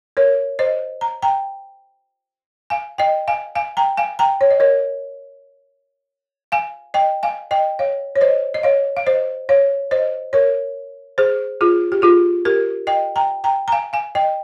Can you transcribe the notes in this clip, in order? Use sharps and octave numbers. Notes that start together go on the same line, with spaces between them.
A#4 C#5
C5 D#5
A#5
G5 A#5
F5 G#5
D#5 G5
F5 G#5
F5 G#5
G5 A#5
F5 G#5
G5 A#5
C#5
D#5
A#4 C#5
F5 G#5
D#5 G5
F5 G#5
D#5 G5
C#5 F5
C#5
C5 D#5
D#5
C#5 F5
F5
C5 D#5
C#5 F5
C5 D#5
A#4 C#5
G#4 C5
F4 G#4
G4
F4 G#4
G4 A#4
D#5 G5
G5 A#5
G5 A#5
A#5
F5 G#5
F5 G#5
D#5 G5